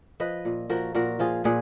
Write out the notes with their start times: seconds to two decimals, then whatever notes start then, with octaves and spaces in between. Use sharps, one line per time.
0.20 F3 B4 D#5
0.45 A#2
0.70 F3 F#4 A#4
0.95 A#2 F#4 A#4
1.19 F3 F4 G#4
1.44 A#2 G#4 B4